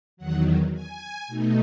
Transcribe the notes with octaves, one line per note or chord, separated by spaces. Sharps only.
E2 D#3 F#3 F#5
G#5
B2 A3 D#4